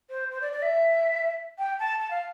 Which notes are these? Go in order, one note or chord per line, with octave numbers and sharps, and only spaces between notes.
C5
C5
D5
D5
E5
G5
A5
A5
F5